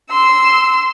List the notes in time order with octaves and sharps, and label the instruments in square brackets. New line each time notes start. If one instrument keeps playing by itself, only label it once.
[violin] C6 E6